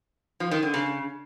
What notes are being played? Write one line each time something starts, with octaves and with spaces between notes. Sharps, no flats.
F3
D#3
D3
C#3